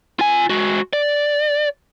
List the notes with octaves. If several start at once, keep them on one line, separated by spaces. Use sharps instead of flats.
F4 G#5
G#3 F#4
D5